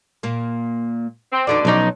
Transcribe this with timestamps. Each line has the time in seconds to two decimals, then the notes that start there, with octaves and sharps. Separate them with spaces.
0.23 A#2 A#3
1.32 C4
1.47 E2 B2 D3 A3 D#4 D5
1.65 B1 F3 F#3 C#4 D#4